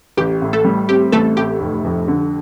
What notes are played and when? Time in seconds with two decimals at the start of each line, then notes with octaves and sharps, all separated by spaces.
0.17 A1 G4
0.42 A2
0.53 A3 A4
0.65 G3
0.89 C4 G4
1.12 A1 A3 A4
1.37 A2 G4
1.60 F1
1.85 F2
2.08 D3